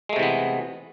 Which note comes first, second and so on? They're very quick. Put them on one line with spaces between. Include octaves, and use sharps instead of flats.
G#3 A3 C3 E3 B3